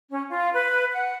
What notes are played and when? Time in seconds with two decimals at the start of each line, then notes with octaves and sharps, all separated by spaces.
0.10 C#4
0.29 F4
0.53 B4
0.92 F#5